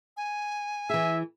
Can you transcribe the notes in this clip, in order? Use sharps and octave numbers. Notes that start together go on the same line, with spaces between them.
G#5
E3 G#4 E5